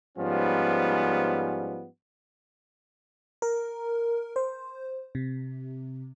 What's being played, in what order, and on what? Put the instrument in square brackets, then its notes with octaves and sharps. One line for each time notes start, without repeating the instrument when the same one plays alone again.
[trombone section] G#2 F3 G3 B3 C#4
[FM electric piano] A#4
C5
C3